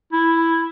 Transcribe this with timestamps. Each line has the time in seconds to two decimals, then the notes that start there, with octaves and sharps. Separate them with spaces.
0.13 E4